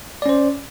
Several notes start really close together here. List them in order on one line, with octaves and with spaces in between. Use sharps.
D5 C#4 C5